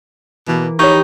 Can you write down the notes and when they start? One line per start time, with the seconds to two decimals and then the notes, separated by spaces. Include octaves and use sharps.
0.48 B2 E3 A#3
0.79 D#4 G4 B4 C#5 C#6 G#6